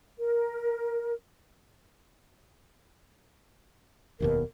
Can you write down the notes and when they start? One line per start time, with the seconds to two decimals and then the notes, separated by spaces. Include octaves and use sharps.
0.18 A#4
4.20 F1 D#2 B2 A#4